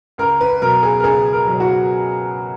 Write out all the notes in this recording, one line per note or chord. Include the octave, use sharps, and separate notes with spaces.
C#2 A#4
B4
B2 F#3 A#4
G#4
A#4
C#2 G#4
A#4
B2 F#3
F#4